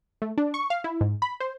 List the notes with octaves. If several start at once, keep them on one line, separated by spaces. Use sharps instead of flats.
A3
D4
C#6
F5
E4
G#2
B5
C5